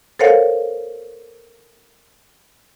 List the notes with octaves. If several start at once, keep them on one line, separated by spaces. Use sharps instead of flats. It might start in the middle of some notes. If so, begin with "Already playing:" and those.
A4 A#4 C5 C#5 F5 F#5